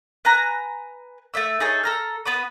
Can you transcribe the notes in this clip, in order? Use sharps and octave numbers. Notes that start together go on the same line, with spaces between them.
B4 G#5 A#5 F#6
A3 A#3 E5 E6
D#4 G#4 A4 C#5
A4 A#5 F6
B3 B4 B5 D#6